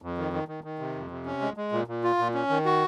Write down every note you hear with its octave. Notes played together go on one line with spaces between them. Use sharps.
F2
D#3
D#3
D#3
D#3
C3
F2
C3
C#4
G#3
G#3
A#2
A#2
F4
A#2
C#4
D#3
F#4